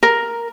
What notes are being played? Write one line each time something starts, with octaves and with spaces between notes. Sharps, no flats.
A#4